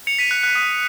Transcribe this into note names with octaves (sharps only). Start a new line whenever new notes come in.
C#7 F7
B6 D#7
F#6
F#6
D#6